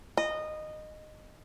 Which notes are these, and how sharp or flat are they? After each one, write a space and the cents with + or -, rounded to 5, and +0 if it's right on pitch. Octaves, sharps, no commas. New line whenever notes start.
D#5 -15